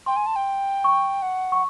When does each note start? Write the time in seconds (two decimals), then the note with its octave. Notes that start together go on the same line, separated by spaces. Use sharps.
0.06 G5 C6
0.16 G#5
0.26 A5
0.36 G5
0.84 C#6
1.22 F#5
1.52 C#6